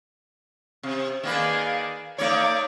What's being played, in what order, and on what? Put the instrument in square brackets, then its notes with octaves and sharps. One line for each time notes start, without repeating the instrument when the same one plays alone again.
[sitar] C3
[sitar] D#3 A#3 B4 [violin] G#4 D5
[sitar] A3 D#4 C#5 [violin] D5 D6